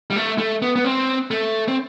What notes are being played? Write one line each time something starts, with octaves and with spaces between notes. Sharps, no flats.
G3
A3
A3
B3
B3
C4
A3
C4